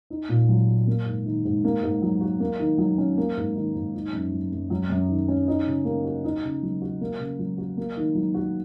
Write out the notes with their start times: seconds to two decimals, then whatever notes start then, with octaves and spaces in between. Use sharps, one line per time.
0.10 D#4
0.29 A#2
0.49 F#3
0.67 F#4
0.87 A#3
1.06 G#2
1.26 D#3
1.45 G#2
1.64 A#3
1.83 G#2
2.02 F#3
2.21 F#4
2.40 A#3
2.60 D#3
2.78 F#3
2.98 C#4
3.17 A#3
3.37 G#2
3.56 D#3
3.75 G#2
3.94 D#4
4.13 F#2
4.32 F#3
4.52 F#2
4.70 F#3
4.90 F#2
5.09 D#3
5.28 C#4
5.48 D#4
5.67 C#3
5.85 A#3
6.04 F#4
6.24 D#4
6.43 C#3
6.63 F#3
6.81 F#4
7.01 A#3
7.19 C#3
7.39 F#3
7.58 F#4
7.77 A#3
7.97 D#3
8.15 F#3
8.34 F#4